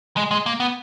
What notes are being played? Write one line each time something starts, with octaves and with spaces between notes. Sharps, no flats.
G#3
G#3
A#3
B3